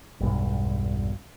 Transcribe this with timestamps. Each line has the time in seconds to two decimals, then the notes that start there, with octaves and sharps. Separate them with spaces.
0.20 E1 B1 G2